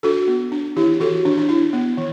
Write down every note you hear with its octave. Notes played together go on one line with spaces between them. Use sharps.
D4 F#4 A4
B3
D4
E3 E4 G4
E3 F#4 A4
E3 D4
D4
D4 E4
B3
E3